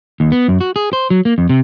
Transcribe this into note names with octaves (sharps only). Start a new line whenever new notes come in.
D#2
B3
F#2
F#4
G#4
C5
F#3
A#3
F2
C3